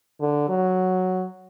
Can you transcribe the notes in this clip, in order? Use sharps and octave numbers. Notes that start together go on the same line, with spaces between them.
D3
F#3